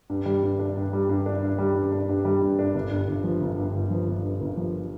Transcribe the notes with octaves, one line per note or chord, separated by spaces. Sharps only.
G2
G3
G2
D4
G2
G3
G2
D4
G2
G3
G2
D4
G2
G3
G2
D4
G1
G2
G1
F3
G1
G2
G1
F3
G1
G2
G1
F3